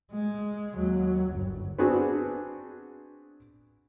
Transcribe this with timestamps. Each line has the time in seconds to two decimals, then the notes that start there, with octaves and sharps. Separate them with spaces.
0.12 G#3
0.76 D#2 F#3
1.30 G1 F#2
1.79 B3 C4 D4 F#4 G#4